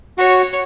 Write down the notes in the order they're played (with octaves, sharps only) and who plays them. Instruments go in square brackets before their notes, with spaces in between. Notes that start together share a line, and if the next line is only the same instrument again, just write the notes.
[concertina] F#4 [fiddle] C#5